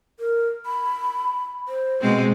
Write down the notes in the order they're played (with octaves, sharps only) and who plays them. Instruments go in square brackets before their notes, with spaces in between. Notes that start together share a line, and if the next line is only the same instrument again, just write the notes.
[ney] A#4
B5
C5
[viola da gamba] B2 G#3 C4